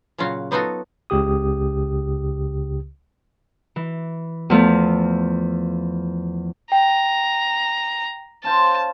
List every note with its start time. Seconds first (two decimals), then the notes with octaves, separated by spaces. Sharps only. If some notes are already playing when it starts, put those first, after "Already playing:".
0.18 A#2 C#3 F#3 F4 F#4
0.51 F#3 B3 D#4 F4 F#4 A4
1.10 C#2 C#3 G4 D#6
3.76 E3
4.50 E2 F3 A3
6.72 G5 A#5
8.44 C#4 F4 C5 A5